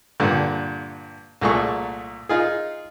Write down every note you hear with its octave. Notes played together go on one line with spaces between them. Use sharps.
G2 A#2 D3
C2 A#2 A3 G#4 C#6
D#4 F4 G#4